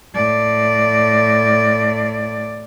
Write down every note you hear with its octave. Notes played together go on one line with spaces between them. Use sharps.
A2 D5